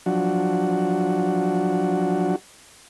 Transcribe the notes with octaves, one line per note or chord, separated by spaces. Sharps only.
F3 F#3 D4 F#4